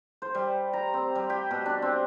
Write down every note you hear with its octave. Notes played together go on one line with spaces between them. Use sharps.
C5
G3
A#5
C4
G3
G4
B2
D4
C4